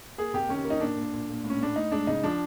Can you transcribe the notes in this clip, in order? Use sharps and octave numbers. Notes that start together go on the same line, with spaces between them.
A#3 G#4
C3 G4
D#3 C#4
A#3
D#4
A#2 D4
A#2
A#2
A#2
A2
C#4
A2 D4
A2 D#4
G#3 D4
C#3 D#4
F3 D4